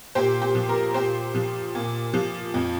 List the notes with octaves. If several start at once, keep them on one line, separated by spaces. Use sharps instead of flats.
A#2 G4 C5
G4
F3
A#4
A#2 G4 C5
F3
A#2
F3
F2